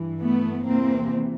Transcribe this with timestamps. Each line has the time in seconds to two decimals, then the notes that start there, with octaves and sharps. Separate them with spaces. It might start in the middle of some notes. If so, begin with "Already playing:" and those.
Already playing: G2 E3
0.21 A3 B3
0.65 E2 C3 E3 A#3 C4